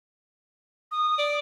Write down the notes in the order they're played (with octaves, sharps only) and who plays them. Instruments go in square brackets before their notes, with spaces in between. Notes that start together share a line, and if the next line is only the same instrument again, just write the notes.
[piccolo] D#6
[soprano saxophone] D5